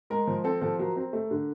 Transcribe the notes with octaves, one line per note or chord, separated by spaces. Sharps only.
G#3 A#4
F3
C4 A4
F3 A4
F#3 A#4
C4
A3
D3